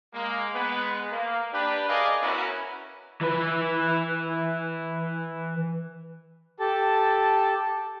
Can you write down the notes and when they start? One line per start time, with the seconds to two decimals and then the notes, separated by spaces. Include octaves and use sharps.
0.14 G#3 A#3
0.54 G#3 B3 B4
1.11 A#3
1.53 D4 G4 B4
1.88 G#4 A#4 D5 D#5 F5 G#5
2.22 B3 C#4 E4 F#4 A#4 B4
3.21 E3 B4
6.60 G4 A4 A5